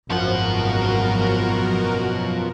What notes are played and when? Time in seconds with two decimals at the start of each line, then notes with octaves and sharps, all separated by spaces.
0.10 G#1 F#2 B2 F3 F#4 A#4 F#5